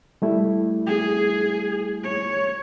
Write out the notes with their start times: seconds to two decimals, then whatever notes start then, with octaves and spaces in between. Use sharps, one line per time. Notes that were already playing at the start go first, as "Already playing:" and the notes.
0.22 G3 A3 E4
0.87 G#4
2.04 C#5